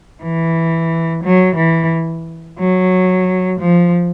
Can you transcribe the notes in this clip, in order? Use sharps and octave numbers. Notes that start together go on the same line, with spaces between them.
E3
F#3
E3
F#3
F3